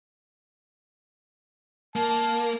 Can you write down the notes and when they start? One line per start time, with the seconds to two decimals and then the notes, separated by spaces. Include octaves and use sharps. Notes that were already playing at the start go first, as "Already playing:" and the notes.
1.96 A#3 A5